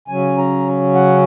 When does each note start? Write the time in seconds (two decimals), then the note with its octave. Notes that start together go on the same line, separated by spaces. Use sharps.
0.08 C#3 F#3 C#4 G#5
0.38 A#5
0.95 F#5